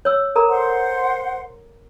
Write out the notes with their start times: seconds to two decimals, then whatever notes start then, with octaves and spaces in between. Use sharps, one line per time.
0.05 C#5 E6
0.36 A4 A#4 A#5
0.49 C5 F#5 C6